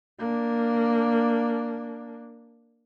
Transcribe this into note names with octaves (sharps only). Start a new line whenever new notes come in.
A#3 D4